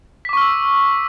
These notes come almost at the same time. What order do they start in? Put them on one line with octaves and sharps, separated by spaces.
B6 D6 C#6 F6 E6